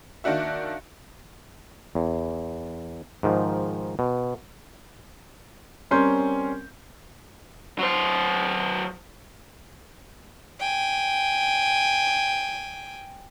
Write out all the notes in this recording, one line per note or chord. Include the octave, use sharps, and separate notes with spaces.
D#3 A#3 D4 F#4 E5
E2
G#2 D#3 F3
B2
G3 C4 C#4 A#4 C6 G6
F#3 C5
G5 G#5